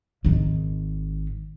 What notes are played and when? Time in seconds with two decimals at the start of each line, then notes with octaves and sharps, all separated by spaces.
0.25 G#1 D#3